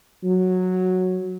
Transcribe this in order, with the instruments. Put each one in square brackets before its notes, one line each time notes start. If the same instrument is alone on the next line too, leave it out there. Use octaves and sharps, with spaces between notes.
[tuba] F#3